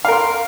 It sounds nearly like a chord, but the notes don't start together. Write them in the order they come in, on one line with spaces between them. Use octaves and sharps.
F5 A#4 C6